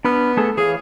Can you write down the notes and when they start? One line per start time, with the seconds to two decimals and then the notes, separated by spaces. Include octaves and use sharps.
0.05 B3 D4 B5 F6
0.37 A3 G#4 A4
0.57 E3 G#4 C#5 F5